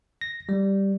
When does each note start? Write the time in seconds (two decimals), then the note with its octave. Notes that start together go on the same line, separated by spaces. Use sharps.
0.21 A#6
0.49 G3